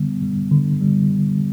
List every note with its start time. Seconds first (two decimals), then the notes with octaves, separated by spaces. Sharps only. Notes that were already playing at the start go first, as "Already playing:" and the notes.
Already playing: D3 G3 B3
0.22 G3
0.51 D3
0.81 G3
1.11 D3